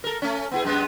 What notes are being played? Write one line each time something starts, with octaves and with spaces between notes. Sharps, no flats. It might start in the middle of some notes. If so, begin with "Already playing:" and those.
A4 A#4
A3 C#4
B3 E4 G#4
F#2 G#3 B3